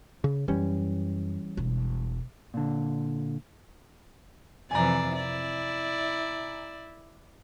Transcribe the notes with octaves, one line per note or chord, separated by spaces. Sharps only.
C#3
F#2 E3 G3 C#4
E1
A#2 D3
F2 C3 E3 D5 G#5 A#5
E4 D5